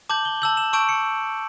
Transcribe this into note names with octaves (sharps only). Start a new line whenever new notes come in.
A5 D6 G6 F#7
G7
A5 E6 G6 F#7
E7
A5 C#6 E6 G6 D7
C#7